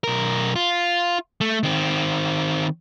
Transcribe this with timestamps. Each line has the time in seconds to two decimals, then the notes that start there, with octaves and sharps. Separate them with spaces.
0.04 B1 A#4
0.55 F4
1.41 A3
1.63 D#3 C4